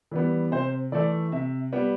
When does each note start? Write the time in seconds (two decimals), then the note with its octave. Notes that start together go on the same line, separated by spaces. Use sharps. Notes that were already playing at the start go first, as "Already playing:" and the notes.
0.11 E3 G3 B3
0.51 C3 C5
0.92 E3 A3 D5
1.32 C3 E5
1.73 G3 B3